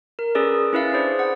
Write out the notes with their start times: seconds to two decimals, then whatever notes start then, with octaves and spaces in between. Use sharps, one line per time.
0.19 A#4
0.35 C#4 G#4 A4 B4 D5
0.73 C#4 E4 B4 E5 F5
0.93 D4 E4 G#4 C5 D5
1.19 F#5